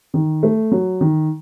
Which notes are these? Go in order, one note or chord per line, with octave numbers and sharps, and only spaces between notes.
D#3
A3
F#3
D#3